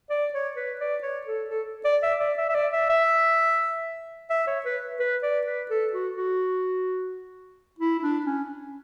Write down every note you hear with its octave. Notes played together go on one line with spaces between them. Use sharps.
D5
C#5
B4
D5
C#5
A4
A4
D5
E5
D5
E5
E5
D5
E5
E5
E5
C#5
B4
B4
D5
B4
A4
F#4
F#4
E4
E4
D4
C#4